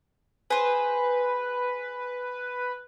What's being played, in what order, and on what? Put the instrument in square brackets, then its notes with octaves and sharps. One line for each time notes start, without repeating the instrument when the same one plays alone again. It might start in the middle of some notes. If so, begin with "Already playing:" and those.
[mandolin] G#4 C5 [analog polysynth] B4